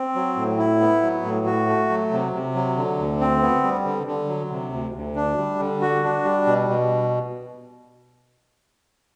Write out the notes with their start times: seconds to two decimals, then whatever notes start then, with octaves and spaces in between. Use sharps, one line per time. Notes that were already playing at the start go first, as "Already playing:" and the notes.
Already playing: C4
0.15 F#3
0.36 A2
0.58 E4
0.81 B3
1.02 F#3
1.24 A2
1.46 F#4
1.67 A3
1.89 F#3
2.12 C3
2.33 C3
2.55 F#3
2.77 D3
2.98 D2
3.20 C4
3.41 B3
3.63 G3
3.85 D3
4.07 D3
4.29 F#3
4.51 C3
4.72 D2
4.94 D2
5.16 D4
5.37 G3
5.59 D3
5.81 F#4
6.04 D4
6.25 G3
6.47 B2
6.68 B2